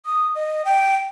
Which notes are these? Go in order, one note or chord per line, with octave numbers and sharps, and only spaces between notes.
D#6
D#5
G5